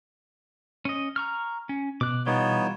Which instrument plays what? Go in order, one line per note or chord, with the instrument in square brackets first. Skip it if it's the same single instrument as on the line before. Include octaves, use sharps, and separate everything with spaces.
[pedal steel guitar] C#4 D#5
A#5 C#6 F6
C#4
[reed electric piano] B2 [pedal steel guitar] D6 F#6
[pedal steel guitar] E3 G3 F4 [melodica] B3 D#4 C#5